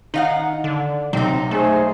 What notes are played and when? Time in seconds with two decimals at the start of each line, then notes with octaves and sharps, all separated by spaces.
0.14 D#3 D#4 F5 F#5
0.64 D3
1.13 B1 C3 C4 D#4
1.51 A3 G#4 C5